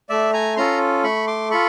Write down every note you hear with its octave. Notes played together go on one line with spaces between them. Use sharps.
A3 D5 E5
G#5 A#5
C#4 F4 A4 A#5 C6
A3 B5 C#6
C6 D6
F4 A4 B5 C#6